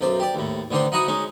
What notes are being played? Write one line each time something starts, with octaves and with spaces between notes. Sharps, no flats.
B1 F#2 C5 D6
G4 D5
D#2 A2
A1 D3 D#3 D4 C5 C6
D#4 E4 F#4 A#5 C#6 D#6
G#3 C#4 D#4